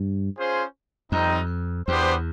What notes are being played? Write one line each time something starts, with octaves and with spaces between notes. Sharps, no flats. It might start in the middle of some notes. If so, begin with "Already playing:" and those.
Already playing: G2
C#4 F4 G#4 C5
F2 G3 C4 D#4
E2 B3 D4 G4 C5